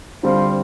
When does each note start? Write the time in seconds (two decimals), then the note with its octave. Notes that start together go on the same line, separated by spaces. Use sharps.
0.23 D3 F3 G3 C4